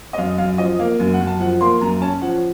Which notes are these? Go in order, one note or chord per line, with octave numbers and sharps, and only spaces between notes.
D#5
F#2 F5
F#2 F5
F3 D#5
A#3 F5
F#2
F#5
F#2
A5
F3 F#5
A#3 C6
F#2 A#5
C#4 A5
F3 F#5